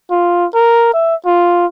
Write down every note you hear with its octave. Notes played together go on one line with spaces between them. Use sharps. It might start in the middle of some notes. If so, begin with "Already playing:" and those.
F4
A#4
E5
F4